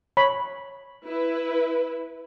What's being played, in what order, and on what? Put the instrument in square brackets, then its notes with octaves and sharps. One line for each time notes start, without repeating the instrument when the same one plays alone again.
[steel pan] C#5 B5
[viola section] E4 B4